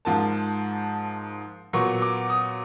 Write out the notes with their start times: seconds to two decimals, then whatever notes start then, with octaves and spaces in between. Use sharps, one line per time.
0.05 G#2 F3 A#3 A5
1.73 A#2 F#3 B3 C#6
2.02 D6
2.30 D#6